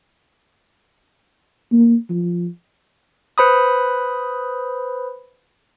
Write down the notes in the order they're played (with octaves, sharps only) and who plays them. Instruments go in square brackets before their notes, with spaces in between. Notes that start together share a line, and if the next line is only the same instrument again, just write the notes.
[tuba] A#3
F3
[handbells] B4 C5 B5 D#6